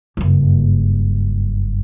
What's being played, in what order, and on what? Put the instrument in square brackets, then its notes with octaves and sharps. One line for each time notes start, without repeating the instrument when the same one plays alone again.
[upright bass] F#1 G2